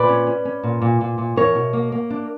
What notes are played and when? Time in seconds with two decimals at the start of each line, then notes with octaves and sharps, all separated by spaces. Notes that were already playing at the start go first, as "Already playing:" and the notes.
Already playing: A#2 B4 D5
0.09 C#4
0.27 C#4
0.45 C#4
0.63 A#2
0.82 A#2
1.01 A#2
1.18 A#2
1.36 E2 A#4 C#5
1.55 B2
1.73 A#3
1.92 A#3
2.10 D4